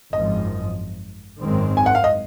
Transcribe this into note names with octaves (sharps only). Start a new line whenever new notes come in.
G#1 F#2 F3 D#5
G#1 F#2 D#3 G#3 C4
G#5
F#5
F5
D#5